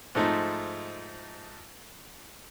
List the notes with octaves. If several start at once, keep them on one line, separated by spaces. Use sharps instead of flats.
G#2 F3 A3 D#4